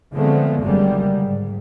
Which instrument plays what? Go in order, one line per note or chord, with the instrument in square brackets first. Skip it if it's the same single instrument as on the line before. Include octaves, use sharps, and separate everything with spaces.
[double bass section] D3 F3 G#3 A3 B3 C4
F#1 F#2 D3 G3 G#3 A#3
G#2